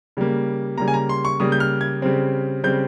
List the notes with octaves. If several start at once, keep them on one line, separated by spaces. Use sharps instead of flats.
C#3 G3 A#3
C#3 G3 A#3 A#5
G#5
A#5
C6
C#6
C#3 G3 A#3 D#6
G6
F6
G#6
C#3 G3 C4
C#3 G3 C4 G6